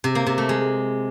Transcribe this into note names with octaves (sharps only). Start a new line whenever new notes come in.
C3
A#3
C3
A3
G#3